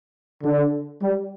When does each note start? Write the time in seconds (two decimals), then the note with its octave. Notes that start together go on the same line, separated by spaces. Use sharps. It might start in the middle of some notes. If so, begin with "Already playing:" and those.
0.44 D3
1.01 G3